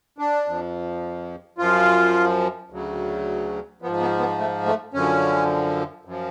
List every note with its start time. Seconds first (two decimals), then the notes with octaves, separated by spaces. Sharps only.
0.18 D4
0.46 F2 F3
1.58 F#2 F3 F4
2.70 D2 C#3 F#3
3.82 G#2 F3 B3
4.01 B3
4.19 B3
4.38 A3
4.66 A3
4.94 F#2 D3 F3 C#4
6.05 F#2 F3